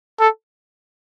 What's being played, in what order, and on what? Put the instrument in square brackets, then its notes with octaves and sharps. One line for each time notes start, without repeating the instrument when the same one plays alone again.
[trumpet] A4